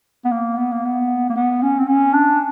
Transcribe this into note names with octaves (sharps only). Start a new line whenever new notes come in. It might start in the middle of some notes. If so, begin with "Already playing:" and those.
B3
A#3
B3
A#3
B3
A#3
B3
C#4
C4
C#4
D4